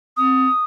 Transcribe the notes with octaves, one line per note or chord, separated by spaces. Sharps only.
C4 D#6